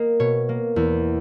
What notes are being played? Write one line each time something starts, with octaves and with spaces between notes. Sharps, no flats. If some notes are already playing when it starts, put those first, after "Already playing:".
Already playing: A#3 D#5
B2 C#5
A#3
E2